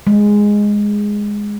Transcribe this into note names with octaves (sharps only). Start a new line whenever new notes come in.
G#3